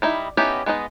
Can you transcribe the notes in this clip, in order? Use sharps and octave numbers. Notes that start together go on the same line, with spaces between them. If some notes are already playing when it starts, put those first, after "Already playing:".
G3 D#4 E4
B3 C#4 D#4 E4 G4
G#3 B3 D#4 D#5